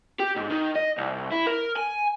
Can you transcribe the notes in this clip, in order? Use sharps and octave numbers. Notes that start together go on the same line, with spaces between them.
G4
G#2
D#3
D#5
C2
E4
A#4
G#5